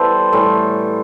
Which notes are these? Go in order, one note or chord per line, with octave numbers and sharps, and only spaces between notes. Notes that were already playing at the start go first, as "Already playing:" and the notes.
Already playing: E3 G3 B3 A4 C5
A2 E3 G3